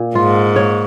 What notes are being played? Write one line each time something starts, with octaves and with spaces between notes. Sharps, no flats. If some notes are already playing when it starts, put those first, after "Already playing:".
Already playing: A#2
G#2 F4
C#5